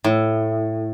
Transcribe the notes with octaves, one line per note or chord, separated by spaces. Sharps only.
A2